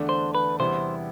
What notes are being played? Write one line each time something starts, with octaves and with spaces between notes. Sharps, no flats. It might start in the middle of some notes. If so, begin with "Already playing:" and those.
Already playing: E2 D3 A3 D4
C5
B4
E2 C3 G3 B3 E4 C5